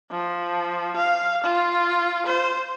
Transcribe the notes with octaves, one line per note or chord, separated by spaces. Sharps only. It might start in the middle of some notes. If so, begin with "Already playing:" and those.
F3
F5
F4
C5